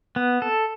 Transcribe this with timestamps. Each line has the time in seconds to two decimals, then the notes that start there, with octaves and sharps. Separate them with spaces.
0.16 B3
0.42 A4